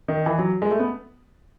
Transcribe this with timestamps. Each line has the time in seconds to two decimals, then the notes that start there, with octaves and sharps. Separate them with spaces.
0.08 D#3
0.26 E3
0.38 F#3
0.62 G#3
0.71 A3
0.79 B3